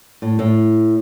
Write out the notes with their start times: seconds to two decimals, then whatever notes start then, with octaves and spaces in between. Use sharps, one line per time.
0.22 A2
0.39 A2